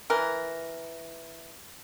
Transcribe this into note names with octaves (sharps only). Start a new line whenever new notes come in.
E3 A#4